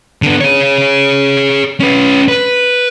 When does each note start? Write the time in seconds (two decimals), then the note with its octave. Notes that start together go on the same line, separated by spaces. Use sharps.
0.22 D3 B3
0.41 G#4 C#5
1.80 C#4 B4
2.28 B4